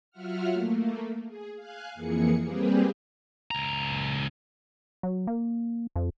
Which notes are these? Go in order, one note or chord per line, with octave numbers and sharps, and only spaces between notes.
F#3 F4 E5 F#5 F6
A3 A#3
G#4
F5 G#5 F#6
F2 E3 A#3 G#4 C#7
G3 A#3 C4 G4 G#4 B4
C#2 A#5
F#3
A#3
F2